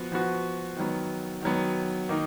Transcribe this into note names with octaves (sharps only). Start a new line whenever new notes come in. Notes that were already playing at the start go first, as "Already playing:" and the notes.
Already playing: F3 B3 F#4
F3 B3 F#4
D#3 F#3 B3
D#3 F#3 B3
D#3 A#3 D#4